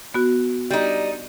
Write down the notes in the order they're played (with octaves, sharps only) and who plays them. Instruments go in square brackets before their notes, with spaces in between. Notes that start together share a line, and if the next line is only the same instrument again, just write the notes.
[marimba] B3 F#4
[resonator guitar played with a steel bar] G3 D#4